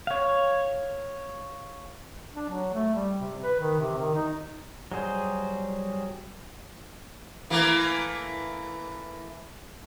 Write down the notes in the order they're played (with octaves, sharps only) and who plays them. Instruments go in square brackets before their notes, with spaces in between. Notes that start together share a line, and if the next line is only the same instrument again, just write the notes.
[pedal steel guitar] C#5 F5
[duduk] D4
F#3
A3
G3
C3
B4
D#3
C3
D#3
D#4
[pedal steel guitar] F#3 G3 G#4 C5
[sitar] E3 A3 A#3